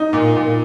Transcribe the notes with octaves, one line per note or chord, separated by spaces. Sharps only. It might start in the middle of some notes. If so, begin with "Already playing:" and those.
Already playing: D#4
A#2
A#2